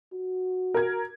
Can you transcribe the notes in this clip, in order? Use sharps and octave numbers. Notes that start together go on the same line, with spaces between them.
F#4
A#4 G#6